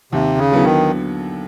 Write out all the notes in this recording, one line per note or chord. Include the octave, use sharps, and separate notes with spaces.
D#2 C3
C#3
D3 F#3 B3 E4
D#3